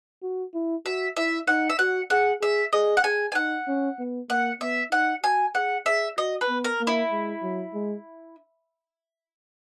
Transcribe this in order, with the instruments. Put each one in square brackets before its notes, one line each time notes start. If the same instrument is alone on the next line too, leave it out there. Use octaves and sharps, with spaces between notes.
[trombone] F#4
E4
[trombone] F#4 [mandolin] E5
[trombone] E4 [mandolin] E5
[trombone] D#4 [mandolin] F#5
[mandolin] E5
[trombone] F#4 [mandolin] F#5
[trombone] G#4 [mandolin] F#5
[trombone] G#4 [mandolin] E5
[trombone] G#4 [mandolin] D#5
[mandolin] F#5
[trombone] G#4 [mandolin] G#5
[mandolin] G#5
[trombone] D#4 [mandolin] F#5
[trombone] C#4
B3
[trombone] A#3 [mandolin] F#5
[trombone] B3 [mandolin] E5
[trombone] D#4 [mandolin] F#5
[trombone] F#4 [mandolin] G#5
[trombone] G#4 [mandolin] F#5
[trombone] G#4 [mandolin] E5
[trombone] F#4 [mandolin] D#5
[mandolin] B4
[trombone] B3
[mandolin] A#4
[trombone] A#3
[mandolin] E4
[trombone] G#3
F#3
G#3